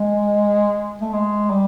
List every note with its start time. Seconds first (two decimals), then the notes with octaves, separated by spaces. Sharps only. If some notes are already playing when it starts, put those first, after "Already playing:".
Already playing: G#3
1.02 A3
1.13 G#3
1.51 G3